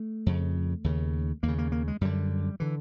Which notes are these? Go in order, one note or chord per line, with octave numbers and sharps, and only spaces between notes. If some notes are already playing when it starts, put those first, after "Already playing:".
Already playing: A3
F2 C#3
D#2 C#3
D#2 A#3
C#3
A#3
A#3
G#3
F#2 D3 G3
D3 E3